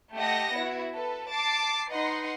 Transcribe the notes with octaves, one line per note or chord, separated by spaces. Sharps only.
A3 G4 D#5 F#5 A#6
B3 E4 F#4
A4 B4
A5 D6 A6 C7
D#4 B4 D#5 F#5 C6